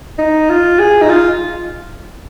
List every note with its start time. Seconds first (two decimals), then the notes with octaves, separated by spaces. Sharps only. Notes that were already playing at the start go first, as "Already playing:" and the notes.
0.18 D#4
0.49 F4
0.79 G#4
1.02 D#4
1.09 F4